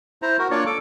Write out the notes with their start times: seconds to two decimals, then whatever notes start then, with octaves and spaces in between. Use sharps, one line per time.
0.22 E4 C5 A#5
0.39 F#4 A#4
0.51 A#3 D4 F4 C#5 D5
0.66 A4 D6